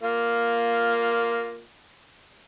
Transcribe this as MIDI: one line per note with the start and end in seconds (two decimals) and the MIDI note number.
0.03 1.64 58
0.03 1.64 65